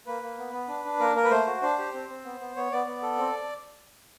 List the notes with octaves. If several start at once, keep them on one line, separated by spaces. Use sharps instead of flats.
A#3 B4
A#3
B3
B3
D4
D4
A#3 A#4
A#3 A#4
B4
A3 C5
F#4
D4 C5
G4
C4
C4
B3
B3
B3 C#5
B3 D5
B3
A4
C4